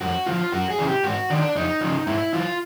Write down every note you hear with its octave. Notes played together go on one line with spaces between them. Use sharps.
F2 F#4
D3 F3 F4
F#2 F#4
G#4
C#3 E3
G4
G#2 F#4
D#3 D4
F2 D#4
C#3 F3
G#2 E4
E3 F4